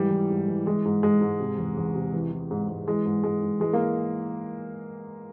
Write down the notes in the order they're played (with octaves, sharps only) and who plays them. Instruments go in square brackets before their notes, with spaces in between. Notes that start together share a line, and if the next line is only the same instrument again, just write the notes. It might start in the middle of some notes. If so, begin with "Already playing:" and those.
Already playing: [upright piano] G#2 E3 G3
E3
G#2
E3
E3 G#3
G#2
G#2 G#3
G#2
C3
E2
E2
C3
E3
E3
G#2
G#2
E3 G#3
G#2
G#2 G#3
G#2
E3 G#3
A#3